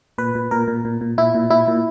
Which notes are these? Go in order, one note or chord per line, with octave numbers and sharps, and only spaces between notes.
A#2 B4
A#2
A#2 A#4
A#2
A#2
A#2
A#2 E4
A#2
A#2 E4
A#2